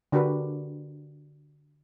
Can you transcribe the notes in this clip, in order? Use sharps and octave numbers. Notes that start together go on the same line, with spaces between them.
D3 D4 F#4 G4 A#4 B4